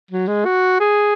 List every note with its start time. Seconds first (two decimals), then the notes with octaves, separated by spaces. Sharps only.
0.11 F#3
0.28 G#3
0.45 F#4
0.80 G#4